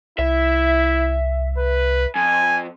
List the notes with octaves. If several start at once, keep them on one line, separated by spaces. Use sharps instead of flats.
C2 E4 E5
B4
F2 G#5